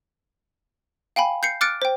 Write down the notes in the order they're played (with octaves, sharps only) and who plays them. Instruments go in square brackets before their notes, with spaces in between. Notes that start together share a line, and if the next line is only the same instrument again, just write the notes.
[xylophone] F5 G5 G#5 B5
G6 C7 C#7
D6 F6 F#6 A6 C#7 D7
C5 G5